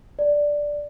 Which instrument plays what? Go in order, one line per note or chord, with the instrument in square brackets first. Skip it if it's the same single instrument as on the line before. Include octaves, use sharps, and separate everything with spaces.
[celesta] D5